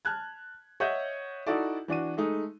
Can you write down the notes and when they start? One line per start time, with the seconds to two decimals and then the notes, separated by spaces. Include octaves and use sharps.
0.05 A5 F6 F#6 G#6
0.80 C#5 D#5 E5 F#5 G6
1.47 D#4 E4 F#4 A4 D5
1.88 E3 D4 F#4 D#7
2.17 G#3 A3 D#4